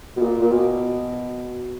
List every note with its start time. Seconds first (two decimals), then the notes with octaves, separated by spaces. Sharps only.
0.16 B2
0.21 A#2
0.41 A#2
0.51 B2